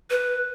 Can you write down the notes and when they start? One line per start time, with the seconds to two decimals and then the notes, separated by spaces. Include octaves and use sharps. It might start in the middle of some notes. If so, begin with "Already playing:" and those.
0.10 B4